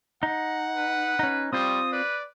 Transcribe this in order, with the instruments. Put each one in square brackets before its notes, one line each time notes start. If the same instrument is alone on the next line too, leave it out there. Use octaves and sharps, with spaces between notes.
[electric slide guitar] D#4 [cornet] F#5
[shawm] B4
[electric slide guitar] C#4 D#4
[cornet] G3 [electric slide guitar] C4 F4 C5 [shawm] D#6
[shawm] B4 [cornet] D5